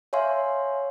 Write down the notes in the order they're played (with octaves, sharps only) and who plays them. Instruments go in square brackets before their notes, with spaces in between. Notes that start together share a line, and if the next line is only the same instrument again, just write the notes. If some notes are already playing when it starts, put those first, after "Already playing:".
[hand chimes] C#5 E5 F5 G#5 C6